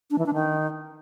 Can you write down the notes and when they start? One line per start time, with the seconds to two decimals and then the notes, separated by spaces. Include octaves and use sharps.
0.11 D4
0.18 E3
0.26 D4
0.34 D#3